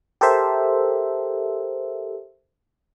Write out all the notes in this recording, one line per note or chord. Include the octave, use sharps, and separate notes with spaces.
G4 A4 A#4 C5 E5